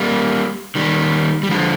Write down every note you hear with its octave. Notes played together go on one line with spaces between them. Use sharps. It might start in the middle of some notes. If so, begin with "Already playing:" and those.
Already playing: G3 A#3
D#3 G3
G3
D3 F3